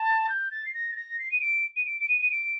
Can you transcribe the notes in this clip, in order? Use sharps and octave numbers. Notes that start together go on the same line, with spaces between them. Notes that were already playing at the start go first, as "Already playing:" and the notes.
Already playing: A5
G6
A6
C7
A#6
A6
A#6
C7
D#7
D7
D#7
D7
D7
D#7
D#7
D7